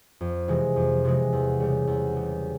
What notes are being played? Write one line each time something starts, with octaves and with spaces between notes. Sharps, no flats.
F2
C3 E3 G#3
F2
C3 E3 G#3
E2
C#3 G3
E2
C#3 G3